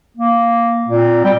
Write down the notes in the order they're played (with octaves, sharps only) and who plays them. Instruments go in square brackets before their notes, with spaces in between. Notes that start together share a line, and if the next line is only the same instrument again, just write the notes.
[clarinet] A#3
[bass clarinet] A#2 [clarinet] C4
[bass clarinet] G3 [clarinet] G5